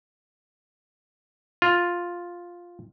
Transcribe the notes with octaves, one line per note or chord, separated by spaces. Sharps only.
F4